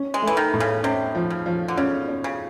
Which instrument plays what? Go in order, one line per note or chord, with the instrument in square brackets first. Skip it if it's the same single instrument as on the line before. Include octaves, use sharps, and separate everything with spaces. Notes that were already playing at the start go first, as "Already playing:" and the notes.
Already playing: [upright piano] C#4
[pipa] G#3
[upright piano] A3
[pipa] E3
D#3
[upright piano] A2
[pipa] C#3
[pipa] C3 [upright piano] C#4
[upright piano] F3
[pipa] C#3
[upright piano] F3
[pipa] D3
[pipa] C#3 [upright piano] C#4
[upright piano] C#4
[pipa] C#3